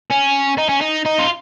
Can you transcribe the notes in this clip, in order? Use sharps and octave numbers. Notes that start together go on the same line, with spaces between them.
C#4
D#4
C#4
D#4
D#4
F4